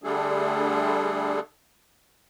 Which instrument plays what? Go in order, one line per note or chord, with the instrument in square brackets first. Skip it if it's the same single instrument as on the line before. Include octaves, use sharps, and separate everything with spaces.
[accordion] D3 G3 A3 D4 G#4 A4